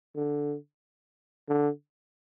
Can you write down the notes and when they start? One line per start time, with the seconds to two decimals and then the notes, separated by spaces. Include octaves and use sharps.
0.16 D3
1.49 D3